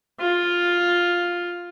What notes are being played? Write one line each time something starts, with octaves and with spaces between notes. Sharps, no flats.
F4